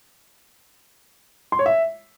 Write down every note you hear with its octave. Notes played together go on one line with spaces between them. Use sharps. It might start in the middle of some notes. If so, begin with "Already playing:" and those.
C6
C#5
E5